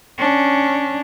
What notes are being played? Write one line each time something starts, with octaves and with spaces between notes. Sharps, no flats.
C#4 D4